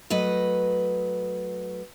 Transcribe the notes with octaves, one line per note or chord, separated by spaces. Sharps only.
F#3 A3 B4 D#5